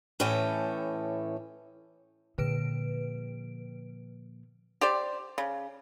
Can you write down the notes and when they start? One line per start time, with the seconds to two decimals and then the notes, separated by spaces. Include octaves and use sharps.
0.20 A2 E3 A3 C#4 G5
2.38 A#2 D3 F3 B4 D7
4.81 G4 C5 D5
5.38 C#3